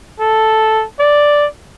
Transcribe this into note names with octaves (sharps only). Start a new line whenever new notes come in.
A4
D5